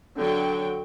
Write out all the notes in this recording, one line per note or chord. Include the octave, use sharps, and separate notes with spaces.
D3 F#3 G5